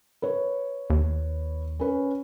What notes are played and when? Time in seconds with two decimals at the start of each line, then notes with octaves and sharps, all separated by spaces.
0.22 B4 C#5
0.90 D#2
1.79 C#4 B4 C#5